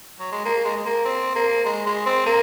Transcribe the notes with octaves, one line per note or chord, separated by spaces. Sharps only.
F#3
G#3
A#3
G#3
G#3
A#3
C4
A#3
G#3
G#3
C4
A#3